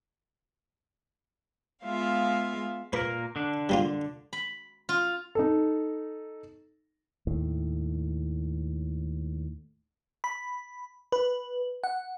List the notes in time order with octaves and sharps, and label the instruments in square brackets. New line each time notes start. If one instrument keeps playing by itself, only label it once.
[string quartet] G#3 B3 F4 E5 F5
[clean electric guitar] A#2 A#3 A#4 [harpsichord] B4
[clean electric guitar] D3 D4
[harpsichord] G3 A#3 F4
[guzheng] B5
F4
[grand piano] D#4 A4
[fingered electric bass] D#2 A2
[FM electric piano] B5
B4
F#5